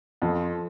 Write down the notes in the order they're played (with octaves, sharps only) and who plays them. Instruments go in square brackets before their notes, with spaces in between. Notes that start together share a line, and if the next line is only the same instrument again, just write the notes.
[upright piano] F2 [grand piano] F3